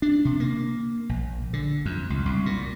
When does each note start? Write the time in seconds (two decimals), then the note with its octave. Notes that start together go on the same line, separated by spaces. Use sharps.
0.02 D4
0.25 C3
0.40 A#3
1.09 A#1
1.53 D3
1.86 F2
2.10 C#2
2.26 C2
2.46 A#2